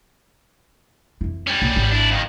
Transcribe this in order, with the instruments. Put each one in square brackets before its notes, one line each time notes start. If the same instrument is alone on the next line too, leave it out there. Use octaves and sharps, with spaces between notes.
[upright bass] F2 E4
[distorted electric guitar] G3 C#4
[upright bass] A#1 C#3
G#1
[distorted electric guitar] D4 E4
F2 D#3